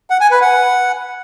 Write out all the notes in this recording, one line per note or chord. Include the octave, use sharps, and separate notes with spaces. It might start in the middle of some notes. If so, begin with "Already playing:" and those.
F#5
G#5
B4
F#5